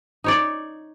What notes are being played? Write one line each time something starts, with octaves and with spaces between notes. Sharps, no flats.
D#4 C#5 D5